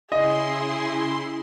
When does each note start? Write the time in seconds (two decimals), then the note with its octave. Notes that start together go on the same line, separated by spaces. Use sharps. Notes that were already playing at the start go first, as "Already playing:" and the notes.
0.12 C#3 E4 G#4 D#5 C6